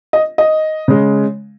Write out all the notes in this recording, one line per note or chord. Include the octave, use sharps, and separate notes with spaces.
D#5
D#5
C#3 G#3